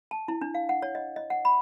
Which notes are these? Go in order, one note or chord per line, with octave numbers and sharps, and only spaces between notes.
A5
E4
D4
F5
F#5
C#5
D#5
D#5
F#5
B5